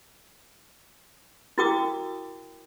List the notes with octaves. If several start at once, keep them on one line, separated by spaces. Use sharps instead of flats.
E4 F#4 A#4 G5 D6 D#6